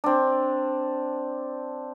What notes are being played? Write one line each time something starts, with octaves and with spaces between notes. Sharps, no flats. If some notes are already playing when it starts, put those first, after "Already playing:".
C4 D4